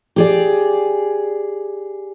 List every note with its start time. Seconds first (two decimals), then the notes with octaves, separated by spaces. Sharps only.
0.16 G4 G#4 D5